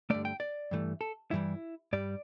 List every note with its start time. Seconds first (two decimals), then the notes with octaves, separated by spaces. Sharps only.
0.10 G2 D3 A3 D5
0.25 G5
0.40 D5
0.71 G2 E3 A3
1.01 A4
1.31 G2 E3 G3 E4
1.93 G2 G3 D5